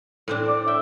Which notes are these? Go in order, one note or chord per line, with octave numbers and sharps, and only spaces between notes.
A2 C4 D4
D5
E5 G5